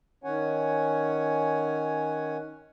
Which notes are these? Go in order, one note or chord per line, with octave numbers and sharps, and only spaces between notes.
D#3 C#4 C#5 F#5 G#5